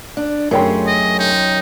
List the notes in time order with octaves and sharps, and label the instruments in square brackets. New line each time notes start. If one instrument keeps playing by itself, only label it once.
[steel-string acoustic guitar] D4
[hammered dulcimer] F#2 G5 C6 [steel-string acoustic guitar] A3 C#4 G#4
[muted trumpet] D#5
D#4